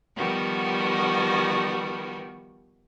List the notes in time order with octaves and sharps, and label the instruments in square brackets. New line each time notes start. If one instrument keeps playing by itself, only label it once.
[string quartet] D#3 F3 G3 B3 F#4